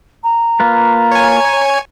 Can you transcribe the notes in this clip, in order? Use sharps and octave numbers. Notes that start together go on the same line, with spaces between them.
A#5
A#3 F4 B4
C#5 G#5